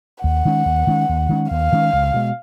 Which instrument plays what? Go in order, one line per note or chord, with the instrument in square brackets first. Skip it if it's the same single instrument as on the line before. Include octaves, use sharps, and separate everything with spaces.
[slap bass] D#2 [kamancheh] F#5
[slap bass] D#3 G#3 C#4
D#2
D#3 G#3 C#4
D#2
D#3 G#3 C#4
[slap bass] D#2 [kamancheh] F5
[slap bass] D#3 G#3 C#4
C#2
B2 G#3